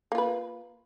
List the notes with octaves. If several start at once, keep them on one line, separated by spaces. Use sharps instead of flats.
A#3 F4 B4